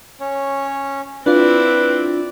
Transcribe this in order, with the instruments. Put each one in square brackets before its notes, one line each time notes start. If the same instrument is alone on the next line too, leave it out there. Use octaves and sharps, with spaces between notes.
[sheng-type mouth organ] C#4 C#5
[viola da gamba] C4 E4 [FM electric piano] D4 F4 [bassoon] B4 [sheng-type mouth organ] D5